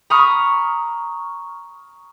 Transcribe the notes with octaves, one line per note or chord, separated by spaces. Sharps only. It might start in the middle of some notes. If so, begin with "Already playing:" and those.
A#5 B5 C#6 D#6 F6